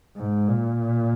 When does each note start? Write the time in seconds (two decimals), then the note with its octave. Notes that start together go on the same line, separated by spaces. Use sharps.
0.17 G#2
0.48 A#2